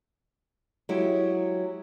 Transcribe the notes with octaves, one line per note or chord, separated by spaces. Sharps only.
F#3 G#3 E4 G4